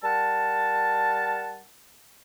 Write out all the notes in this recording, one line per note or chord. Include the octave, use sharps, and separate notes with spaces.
G3 A#4 F#5 A5